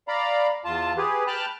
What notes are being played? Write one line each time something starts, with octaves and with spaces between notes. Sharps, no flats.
D5 F5 A#5 B5
E2 F4 A5
G4 G#4 B4
G5 A5 B5 F6 F#6